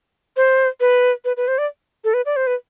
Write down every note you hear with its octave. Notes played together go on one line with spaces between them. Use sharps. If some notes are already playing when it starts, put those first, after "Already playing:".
C5
B4
B4
B4
C5
D5
A4
B4
D5
C5
B4